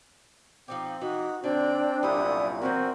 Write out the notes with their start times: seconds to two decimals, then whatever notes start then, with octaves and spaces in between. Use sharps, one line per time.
0.68 F3 C4 D#4 G4
1.01 E3 D#4 F#4
1.44 D3 C4 D4 D5 G5
2.03 C2 F#2 A#2 G3 A3 E4 D#6
2.62 E3 B3 C4 F#4 A#4 B4